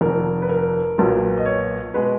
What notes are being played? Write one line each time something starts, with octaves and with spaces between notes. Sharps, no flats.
F1 F2 D#3 A#4
B4
A#4
B1 A#2 F#3 B3
D#5
C#5
B2 G#3 B3 B4